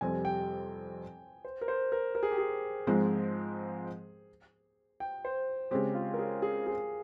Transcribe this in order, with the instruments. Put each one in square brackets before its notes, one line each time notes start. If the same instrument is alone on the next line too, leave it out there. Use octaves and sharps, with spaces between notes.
[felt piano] F2 C3 G3 C4 [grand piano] G#5
[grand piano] G5
C5
A#4
C5
A#4
A#4
G#4
G4
G#4
[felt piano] G#2 F3 G#3 C4
[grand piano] G5
C5
[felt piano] C#3 G#3 C4 [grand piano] G4
[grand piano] F4
A#4
G#4
G#4
G#4